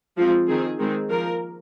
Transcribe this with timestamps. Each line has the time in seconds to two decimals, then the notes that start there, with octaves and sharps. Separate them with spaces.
0.18 F3 G#3 C4 F4
0.48 D#3 C4 G#4
0.79 D#3 G#3 C4
1.10 F3 A#3 A#4